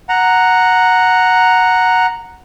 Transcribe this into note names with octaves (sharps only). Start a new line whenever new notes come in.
F#5 A#5